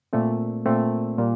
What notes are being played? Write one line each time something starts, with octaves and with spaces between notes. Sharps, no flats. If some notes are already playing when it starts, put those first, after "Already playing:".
A#2 A3 C4
A#2 A3 C4
A#2 G3 A#3